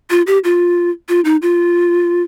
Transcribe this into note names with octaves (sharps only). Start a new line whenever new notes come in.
F4
G4
F4
F4
D#4
F4